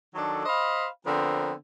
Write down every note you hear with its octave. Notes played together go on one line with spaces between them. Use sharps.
D#3 F#3 D4 A4
C5 D#5 F5 B5
D3 F3 B3 C4 A#4